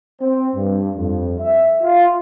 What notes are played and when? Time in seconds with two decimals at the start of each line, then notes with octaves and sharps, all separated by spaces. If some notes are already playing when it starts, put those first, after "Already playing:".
0.21 C4
0.56 G2
0.97 F2
1.40 E5
1.82 F4